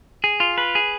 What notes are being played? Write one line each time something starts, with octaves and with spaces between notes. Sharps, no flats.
G#4
F4
B4
G#4